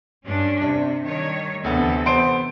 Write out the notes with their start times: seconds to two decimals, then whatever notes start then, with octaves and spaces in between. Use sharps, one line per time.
0.25 G2 C#4 D4
0.62 C3 D4
1.05 D#3 G3 C#5
1.64 D2 C3 E3 B3 A4
2.06 B3 C5 D7